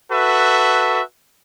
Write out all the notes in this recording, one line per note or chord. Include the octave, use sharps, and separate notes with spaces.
F#4 A4 B4 E5